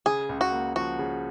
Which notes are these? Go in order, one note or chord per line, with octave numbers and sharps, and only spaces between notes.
C#3 G#4
C#2
F#4
A#3
F3 F#4
C#3